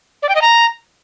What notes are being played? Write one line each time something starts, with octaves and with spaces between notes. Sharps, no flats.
D5
G5
D#5
A#5